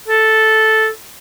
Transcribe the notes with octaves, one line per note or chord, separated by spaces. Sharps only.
A4